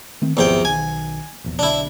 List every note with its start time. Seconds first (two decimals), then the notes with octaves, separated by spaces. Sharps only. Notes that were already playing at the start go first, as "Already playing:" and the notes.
0.22 D#3 A3 C4
0.37 G#1 E2 C3 F3 G5
0.65 B1 D#3 G#5
1.44 E1 A#1 E2
1.59 B1 D3 D4 E4